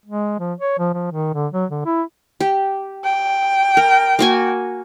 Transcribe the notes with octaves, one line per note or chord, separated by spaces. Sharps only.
G#3
F3
C#5
F3
F3
D#3
D3
F#3
D3
E4
G4
G5
A#4
A#3 F#4 G#5